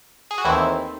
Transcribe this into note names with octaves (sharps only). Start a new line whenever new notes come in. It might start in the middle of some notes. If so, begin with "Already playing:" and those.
G#4
F#4
D#2 D#3 E3 A3 C4 E4